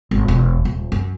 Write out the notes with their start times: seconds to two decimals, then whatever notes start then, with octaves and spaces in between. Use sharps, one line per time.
0.11 G#1
0.28 E1
0.65 D#1
0.92 F#2